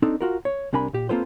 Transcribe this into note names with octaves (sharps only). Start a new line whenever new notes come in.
C4 D4 D#4 A4
F4 F#4 A#4
C#5
C2 C3 D4 A#4 G#5 B5
A#2 G4
A#3 C4 F4 A4 B4 C5